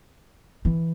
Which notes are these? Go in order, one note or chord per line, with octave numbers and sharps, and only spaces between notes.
E3